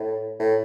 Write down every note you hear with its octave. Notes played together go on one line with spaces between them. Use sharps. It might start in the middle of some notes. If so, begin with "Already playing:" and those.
Already playing: A2
A2